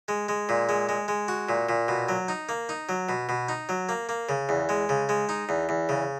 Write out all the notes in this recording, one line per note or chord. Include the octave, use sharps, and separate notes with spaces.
G#3
G#3
A#2
G#3
G#3
G#3
F#4
A#2
A#2
B2
F#3
D#4
A#3
D#4
F#3
B2
B2
D#4
F#3
A#3
A#3
C#3
E2
G#3
C#3
G#3
D#4
E2
E2
C#3